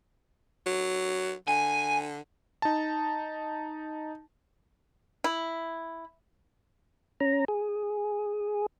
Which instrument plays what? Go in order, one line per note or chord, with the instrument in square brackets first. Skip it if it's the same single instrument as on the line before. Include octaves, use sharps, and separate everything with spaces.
[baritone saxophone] F#3
[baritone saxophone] D3 [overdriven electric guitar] G#5
[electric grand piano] D#4 A5
[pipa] E4
[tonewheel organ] C#4 A#5
G#4